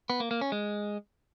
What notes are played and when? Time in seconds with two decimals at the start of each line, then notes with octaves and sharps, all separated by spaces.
0.10 B3
0.20 A#3
0.31 A#3
0.41 C#4
0.52 G#3